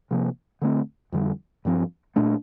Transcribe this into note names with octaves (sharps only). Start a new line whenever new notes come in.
C3 F3 A#3
D3 A3 C4
F2 D3 G3
G2 F3 C4
A#2 A3 D4